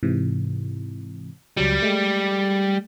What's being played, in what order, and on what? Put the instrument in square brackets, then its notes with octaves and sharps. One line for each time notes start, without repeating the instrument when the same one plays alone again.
[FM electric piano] G#2 C3 E3
[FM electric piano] C#2 F#3 [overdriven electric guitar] G3
[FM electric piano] G#3 A3